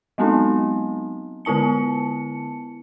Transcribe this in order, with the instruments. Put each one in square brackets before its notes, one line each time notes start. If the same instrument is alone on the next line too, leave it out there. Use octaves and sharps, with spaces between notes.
[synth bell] F#3 G#3 B3 C4 D#4
D3 B3 E4 A5 C#7